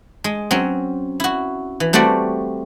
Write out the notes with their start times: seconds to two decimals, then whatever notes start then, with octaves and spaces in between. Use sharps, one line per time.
0.24 G#3
0.51 F#3 C4 C#4
1.20 E4 F#4
1.80 E3
1.93 G3 A3 C4 F#4 D5